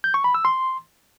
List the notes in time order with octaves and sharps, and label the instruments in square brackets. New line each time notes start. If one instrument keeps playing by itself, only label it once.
[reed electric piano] G6
C#6
B5
E6
C6